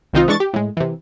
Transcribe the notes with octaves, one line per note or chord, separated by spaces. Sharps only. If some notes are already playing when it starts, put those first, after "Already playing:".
C2 D#3 C4 D#4 F4
E3 G#3 D4 C#6 A6
G4
A2 G#3
C3 E3